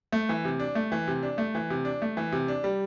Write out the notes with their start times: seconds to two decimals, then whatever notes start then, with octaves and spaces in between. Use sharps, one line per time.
0.12 A3
0.29 E3
0.45 C3
0.60 D4
0.75 A3
0.92 E3
1.08 C3
1.23 D4
1.38 A3
1.55 E3
1.70 C3
1.85 D4
2.02 A3
2.17 E3
2.32 C3
2.48 D4
2.64 G3